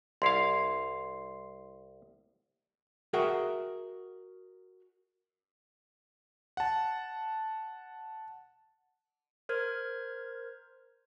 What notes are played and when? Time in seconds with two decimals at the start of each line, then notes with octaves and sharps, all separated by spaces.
0.22 C2 E4 F5 C6 C7
3.13 F#4 G#4 A#4 E5 F#5 G5
6.57 F#5 A5
9.49 A#4 C5 F6 G#6